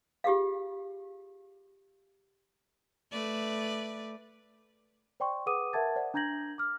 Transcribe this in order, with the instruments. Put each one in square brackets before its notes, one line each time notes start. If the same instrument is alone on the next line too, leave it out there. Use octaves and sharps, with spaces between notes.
[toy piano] F4 G4 G#4 F5
[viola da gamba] A3 B4 D5
[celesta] C5 D5 G5 C6 C#6
G#4 B4 F#5 D6 D#6 D#7
A#4 E5 F#5 A5 G#6 A6
C5 D5 F#5
D4 A#5 G6 G#6 A#6 F#7
D6 F6